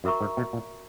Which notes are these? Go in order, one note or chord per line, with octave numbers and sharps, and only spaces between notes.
F#2 F#4 A#4 E5 A#5 C#6
G#2
B2
A#2